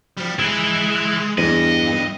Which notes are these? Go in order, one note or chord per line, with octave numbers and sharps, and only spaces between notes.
F3 G3
G#3 E4 B4
E2 G2 D#5